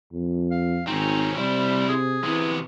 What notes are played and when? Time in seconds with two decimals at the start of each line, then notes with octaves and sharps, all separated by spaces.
0.13 F2
0.51 F5
0.87 G#1 C4 C#4 D#4
1.37 C3 G3 E4 C5
1.89 G#4
2.24 C3 E3 B3